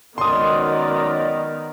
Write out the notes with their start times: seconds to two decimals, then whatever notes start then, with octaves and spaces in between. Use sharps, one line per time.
0.18 F#2 D#3 G#3 B3 D5 C6 D#6